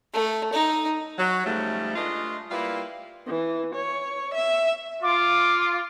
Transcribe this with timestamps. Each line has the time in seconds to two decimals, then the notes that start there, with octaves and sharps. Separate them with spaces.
0.14 A3
0.53 D#4
1.18 F#3
1.46 G#2 C#3 F3 G3 A3
1.96 G#3 A3 D4 F4 B4 D#5
2.51 G3 A#3 E4 F4 B4 F5
3.26 E3
3.74 C#5
4.34 E5
5.03 F4 D6